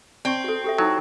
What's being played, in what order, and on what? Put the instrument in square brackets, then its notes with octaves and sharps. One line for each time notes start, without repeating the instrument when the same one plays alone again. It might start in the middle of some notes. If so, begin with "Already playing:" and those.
[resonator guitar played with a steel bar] C4 [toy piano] D5 C#6
[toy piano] F#4 A4
G4 A4 E5
[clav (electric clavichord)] F#3 [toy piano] D#4 E4 A4